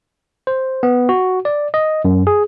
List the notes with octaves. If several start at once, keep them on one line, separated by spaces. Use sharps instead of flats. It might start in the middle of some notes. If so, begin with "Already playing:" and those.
C5
B3
F#4
D5
D#5
F#2
G#4